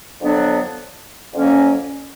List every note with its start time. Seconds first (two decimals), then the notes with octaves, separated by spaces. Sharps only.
0.20 F2 D3 F#3 B3 D4
1.33 F2 D3 F#3 A#3 C#4